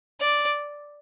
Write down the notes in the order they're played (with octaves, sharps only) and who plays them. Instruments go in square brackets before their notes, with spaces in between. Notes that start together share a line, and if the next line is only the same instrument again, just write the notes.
[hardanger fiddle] D5